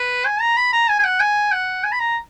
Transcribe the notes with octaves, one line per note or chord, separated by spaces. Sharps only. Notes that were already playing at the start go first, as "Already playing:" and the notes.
Already playing: B4
G#5
A#5
B5
A#5
G#5
G#5
F#5
G#5
F#5
G#5
B5
A#5